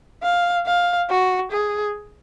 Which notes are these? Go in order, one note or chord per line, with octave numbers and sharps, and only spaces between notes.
F5
F5
F#4
G#4